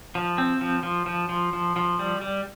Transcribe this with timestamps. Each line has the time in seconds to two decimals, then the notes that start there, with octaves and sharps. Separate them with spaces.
0.15 F3
0.38 C4
0.61 F3
0.83 F3
1.06 F3
1.29 F3
1.53 F3
1.76 F3
1.99 G3
2.21 G3